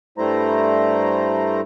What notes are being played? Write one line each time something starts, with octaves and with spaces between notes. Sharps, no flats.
G2 G3 A3 E4 C5 A#5